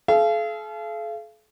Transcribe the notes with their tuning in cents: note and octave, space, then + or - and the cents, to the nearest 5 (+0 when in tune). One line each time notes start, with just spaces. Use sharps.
A4 -45 F5 -35